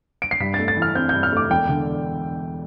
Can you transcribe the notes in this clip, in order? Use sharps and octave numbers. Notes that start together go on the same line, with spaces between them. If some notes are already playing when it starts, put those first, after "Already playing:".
D7
C7
G2 B6
A6
A3
A6
E3
F6
C4 G6
G2 G6
F6
A3 D6
E1 G5
D3